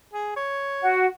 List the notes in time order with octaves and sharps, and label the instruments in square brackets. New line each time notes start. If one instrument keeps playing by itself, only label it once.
[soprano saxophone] G#4
C#5
[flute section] F#4